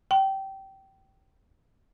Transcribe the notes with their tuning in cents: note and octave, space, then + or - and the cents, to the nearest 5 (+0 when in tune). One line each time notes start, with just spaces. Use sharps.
G5 -20